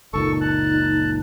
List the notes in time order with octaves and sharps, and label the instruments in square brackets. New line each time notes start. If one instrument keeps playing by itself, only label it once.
[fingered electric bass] F#1 C#2 A#2 [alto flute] D#4 [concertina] A4 C#6
[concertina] A5 F#6